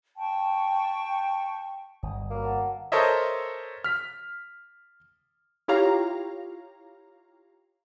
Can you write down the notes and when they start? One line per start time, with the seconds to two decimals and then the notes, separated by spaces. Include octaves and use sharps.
0.17 G5 A5 C#6
2.03 G1 D#5 D#6
2.30 F#3 A#3 B3
2.42 E5 A5
2.92 A4 A#4 C5 C#5 D#5 E5
3.84 F6 B6
5.68 E4 F4 G4 C#5 F5 A#5